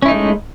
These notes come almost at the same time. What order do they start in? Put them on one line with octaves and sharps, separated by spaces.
C#4 E4 D#4 A3 G#3